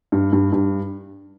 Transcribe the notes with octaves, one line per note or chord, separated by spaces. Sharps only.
G2
G2
G2